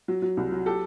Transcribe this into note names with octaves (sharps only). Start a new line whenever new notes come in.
F#3
F#3
C2
F#3
G4 A4